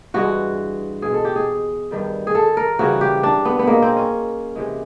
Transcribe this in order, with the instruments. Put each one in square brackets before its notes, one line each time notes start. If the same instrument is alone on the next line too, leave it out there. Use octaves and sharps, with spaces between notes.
[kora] G2 E3 G#3 F#4
B2 G#3 G#4
A4
G4
G#4
G2 D#3 G3
G#4
A4
A#4
C#3 E3 G3 F#4
G4
D4
B3
B3
B2 G#3 A#3
C4
C#4
C3 E3 G#3